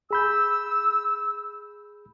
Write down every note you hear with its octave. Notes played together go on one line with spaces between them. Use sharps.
G#4 B5 E6 G6